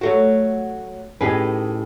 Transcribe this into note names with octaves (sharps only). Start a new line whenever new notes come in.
F#3 A3 F#4
A2 C#4 D#4 G4 G#4 B4